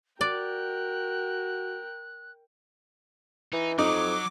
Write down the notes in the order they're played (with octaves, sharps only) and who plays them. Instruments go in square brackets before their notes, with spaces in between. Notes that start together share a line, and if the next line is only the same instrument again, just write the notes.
[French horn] F#4 [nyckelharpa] A#4 G5 [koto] D5 [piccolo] F#6
[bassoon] E3 [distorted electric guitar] D#4
[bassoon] F2 [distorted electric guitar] F#3 [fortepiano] D#4 [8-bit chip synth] D6